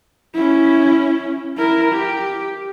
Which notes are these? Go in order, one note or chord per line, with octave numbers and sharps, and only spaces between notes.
C#4 E4
E4 A#4
G4